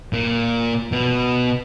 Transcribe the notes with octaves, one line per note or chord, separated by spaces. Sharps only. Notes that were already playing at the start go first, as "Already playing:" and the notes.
A#2
B2